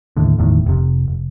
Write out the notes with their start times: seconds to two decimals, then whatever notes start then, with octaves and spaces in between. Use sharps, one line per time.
0.17 D#2 A2 D3
0.38 G1 E2 A2 D#3
0.66 F1 C3
1.08 F1